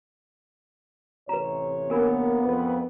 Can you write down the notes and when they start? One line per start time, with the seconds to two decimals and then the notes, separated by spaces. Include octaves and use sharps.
1.29 A1 C3 B4 C#5 A#5
1.90 A#3 B3 D4 A#4 G#5
2.43 F2 B4